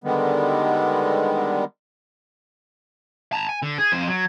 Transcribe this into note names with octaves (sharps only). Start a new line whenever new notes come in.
D3 D#3 G3 G#3 B3
A5 A#5
G#5
D3
G#4
F2 C5
F#3